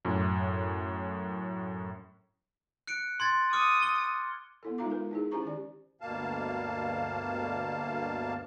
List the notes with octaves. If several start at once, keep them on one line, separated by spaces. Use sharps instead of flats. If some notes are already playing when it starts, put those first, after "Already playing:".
F#2 A2
F#6 C#7 D7
C6 G#6 A6
D6 D#6 F6 C#7
G7
B3 E4 A4
G#3 D#4 F4 F5 A#5 D6
A#4 B4
D#4 E4 G#4
C#4 E4 G4 C5 A#5 C#6
D#3 G4 D5
D2 G2 B2 A#3 F5 A5